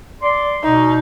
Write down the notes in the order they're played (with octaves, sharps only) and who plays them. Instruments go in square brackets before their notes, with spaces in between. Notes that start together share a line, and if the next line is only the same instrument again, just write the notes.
[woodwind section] D5 C6
[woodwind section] B2 [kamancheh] D#4